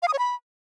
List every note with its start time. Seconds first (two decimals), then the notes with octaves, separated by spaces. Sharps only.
0.03 F5
0.08 D#6
0.13 C#5
0.19 B5